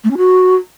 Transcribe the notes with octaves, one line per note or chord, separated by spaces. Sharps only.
A3
C#4
F#4